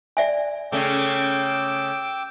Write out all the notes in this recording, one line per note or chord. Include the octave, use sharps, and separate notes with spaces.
D5 E5 G#5
C#3 A3 C#4 G5 D6 E6